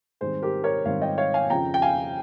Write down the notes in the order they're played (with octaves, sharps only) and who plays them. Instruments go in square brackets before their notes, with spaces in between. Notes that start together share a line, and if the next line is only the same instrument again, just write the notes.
[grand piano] G#2 D#3 G3 C4 G#4 C5
G4 A#4
A#4 C#5
G#2 D#3 G3 C4 C#5 F5
D#5 G5
C#5 F5
F5 G#5
F2 C#3 F3 G5 A#5
G5
F5 G#5